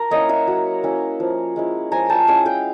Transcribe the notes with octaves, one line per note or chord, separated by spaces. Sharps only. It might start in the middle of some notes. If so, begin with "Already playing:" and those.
Already playing: A#4
A#3 C#4 E4 C#5 D#5
E5 F#5
F#3
A#3 C#4 E4
F3
G#3 C#4 E4
F3 G#5 A#5
G5 A5
G#3 C#4 E4 F#5 G#5
F5 G5